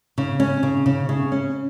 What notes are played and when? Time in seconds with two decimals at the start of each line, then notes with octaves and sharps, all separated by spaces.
0.18 C#3
0.40 C#4
0.63 C#3
0.86 C#3
1.09 C#3
1.32 C#4